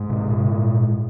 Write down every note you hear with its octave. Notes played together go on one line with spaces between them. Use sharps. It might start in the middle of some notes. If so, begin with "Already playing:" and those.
Already playing: G#2 G#3
C3
A#2